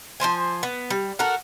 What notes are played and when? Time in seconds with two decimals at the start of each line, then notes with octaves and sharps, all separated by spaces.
0.20 F3 C4 C5 G#5
0.63 B3
0.90 G3
1.19 F#4 A4 A#4 F#5